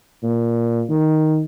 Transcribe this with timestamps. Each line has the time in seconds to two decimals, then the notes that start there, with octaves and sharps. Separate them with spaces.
0.23 A#2
0.89 D#3